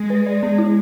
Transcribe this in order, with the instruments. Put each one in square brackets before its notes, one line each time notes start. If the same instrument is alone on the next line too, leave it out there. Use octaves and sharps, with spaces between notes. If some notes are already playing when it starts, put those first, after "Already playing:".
Already playing: [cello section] G#3
[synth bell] B4
D5
B3
E4